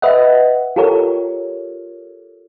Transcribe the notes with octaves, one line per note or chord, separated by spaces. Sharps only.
B4 D#5 E5 F#5
F4 G4 A4 A#4 C#5